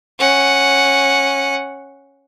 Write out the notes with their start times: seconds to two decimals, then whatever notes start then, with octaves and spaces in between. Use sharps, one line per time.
0.19 C#4 F#5